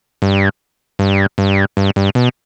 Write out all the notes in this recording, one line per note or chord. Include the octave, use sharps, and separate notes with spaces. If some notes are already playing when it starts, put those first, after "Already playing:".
G2
G2
G2
G2
G2
B2